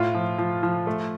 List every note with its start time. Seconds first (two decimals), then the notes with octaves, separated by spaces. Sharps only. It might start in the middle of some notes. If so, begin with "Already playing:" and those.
Already playing: A2 F4
0.14 F3
0.38 F3
0.63 F3
0.87 A3